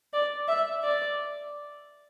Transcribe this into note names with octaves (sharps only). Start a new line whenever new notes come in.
D5
E5
D5